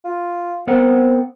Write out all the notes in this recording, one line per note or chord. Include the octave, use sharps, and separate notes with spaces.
F4
B3 C4 A#4 F#5